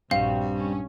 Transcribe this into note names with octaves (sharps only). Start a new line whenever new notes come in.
A#1 G2 G3 C4 F#4 F5
C#4